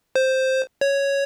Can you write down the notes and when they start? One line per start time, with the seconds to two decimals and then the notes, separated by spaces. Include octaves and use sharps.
0.15 C5
0.81 C#5